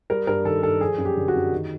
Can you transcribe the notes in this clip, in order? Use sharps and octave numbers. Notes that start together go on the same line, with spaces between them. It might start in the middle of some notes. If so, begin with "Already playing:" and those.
G3 A#4
G2 A#4
D#3 A4
G2 A4
F3 G#4
F#2
G4
D3
F#4
F#2
D#3